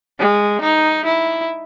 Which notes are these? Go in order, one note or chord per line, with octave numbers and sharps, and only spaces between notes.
G#3
D#4
E4